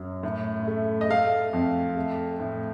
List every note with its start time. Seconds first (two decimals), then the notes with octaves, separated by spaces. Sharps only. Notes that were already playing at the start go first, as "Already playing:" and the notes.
Already playing: F#2 F#3
0.23 A2
0.67 A3
1.01 D#5
1.10 A3 F5
1.53 F2
1.97 A3
2.40 A2